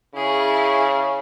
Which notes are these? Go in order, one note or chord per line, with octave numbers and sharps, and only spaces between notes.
C#3 E4 G#4